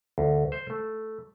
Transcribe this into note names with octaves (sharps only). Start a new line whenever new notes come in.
D2
C5
A3